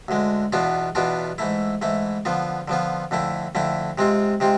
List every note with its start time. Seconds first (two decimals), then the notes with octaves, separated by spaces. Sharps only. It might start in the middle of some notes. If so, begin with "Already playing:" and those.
0.08 D2 D3 G#3
0.52 E2 B2 B3 D4 F4
0.95 E2 B2 B3 D4 F4
1.38 G#2 E3 A3 E4
1.82 G#2 E3 A3 E4
2.25 D3 F3 B3 F4
2.68 D3 F3 B3 F4
3.11 F2 D3 A3 E4
3.55 F2 D3 A3 E4
3.98 C3 G#3 C4 F4
4.40 C3 G#3 C4 F4